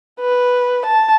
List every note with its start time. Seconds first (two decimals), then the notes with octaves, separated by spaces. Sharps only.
0.20 B4
0.86 A5